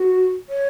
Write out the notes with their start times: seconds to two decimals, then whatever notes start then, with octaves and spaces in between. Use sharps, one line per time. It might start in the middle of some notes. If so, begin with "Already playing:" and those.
Already playing: F#4
0.49 C#5